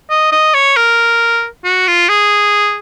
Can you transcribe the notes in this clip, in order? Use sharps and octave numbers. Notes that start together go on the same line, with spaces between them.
D#5
D#5
C#5
A#4
F#4
F4
G#4